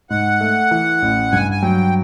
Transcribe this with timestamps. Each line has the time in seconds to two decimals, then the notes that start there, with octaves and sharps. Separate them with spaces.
0.10 G#2 F#5
0.41 A3
0.71 E3
1.02 A1
1.32 G2 G#5
1.51 G#5
1.62 F#3 G5